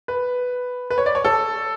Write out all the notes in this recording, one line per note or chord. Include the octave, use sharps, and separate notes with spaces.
B4
B4
C#5
D5
C#5
A4